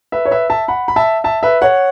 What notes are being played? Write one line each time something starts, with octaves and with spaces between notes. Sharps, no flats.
B4 E5
C#5
B4 E5
E5 A5
F#5 B5
B5
E5 A5
E5 A5
B4 E5
C#5 F#5